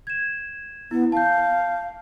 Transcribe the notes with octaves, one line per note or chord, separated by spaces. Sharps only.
G#6 E7
B3 E4
F5 A5 G6